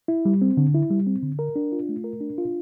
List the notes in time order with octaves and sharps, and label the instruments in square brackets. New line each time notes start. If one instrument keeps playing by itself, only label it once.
[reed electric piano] E4
G3
C4
D3
E4
G3
C4
D3
A#4
D4
F4
A3
A#4
D4
F4